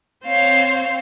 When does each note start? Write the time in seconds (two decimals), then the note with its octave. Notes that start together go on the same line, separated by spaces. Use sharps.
0.24 C4 C5 C#5 F5